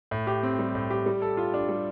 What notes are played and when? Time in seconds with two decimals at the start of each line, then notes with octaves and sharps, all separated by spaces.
0.11 A2
0.27 G4
0.43 C4
0.59 G3
0.75 A2
0.90 G4
1.06 G3
1.22 A4
1.37 F4
1.54 D4
1.69 G3